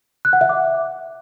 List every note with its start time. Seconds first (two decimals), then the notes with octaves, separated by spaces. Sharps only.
0.25 F#6
0.33 F#5
0.41 E5
0.49 D6